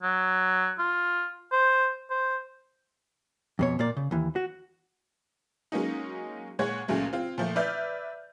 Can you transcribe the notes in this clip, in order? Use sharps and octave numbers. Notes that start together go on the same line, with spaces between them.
F#3
F4
C5
C5
F2 B2 C#5
A#2 A#3 D5
C#3
D#2 E3
F#4
F#3 G#3 A#3 C#4 D#4
A#2 G#3 C#5 F#5 G#6
C#2 A#2 C#3 F#3 G#3 A3
C4 F4
A#2 F3 A3
B4 D5 E5 F6 G6